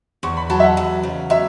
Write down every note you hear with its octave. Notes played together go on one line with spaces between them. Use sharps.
E2 C#6
B5
F#3 A5
E5
F#5
E2
C#3
F#3 E5